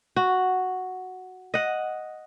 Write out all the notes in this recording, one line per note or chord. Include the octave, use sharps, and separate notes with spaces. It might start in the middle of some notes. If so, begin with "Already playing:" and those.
F#4
D#5 F#5